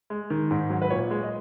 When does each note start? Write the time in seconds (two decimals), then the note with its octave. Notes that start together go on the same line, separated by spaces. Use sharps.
0.10 G#3
0.30 D#3
0.51 G#2
0.70 F#3
0.82 B4
0.90 A#2 C#5
1.11 G#3
1.23 D#5